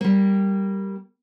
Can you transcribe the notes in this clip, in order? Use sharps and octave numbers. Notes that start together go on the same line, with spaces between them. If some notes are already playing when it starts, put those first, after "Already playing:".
G3 A#3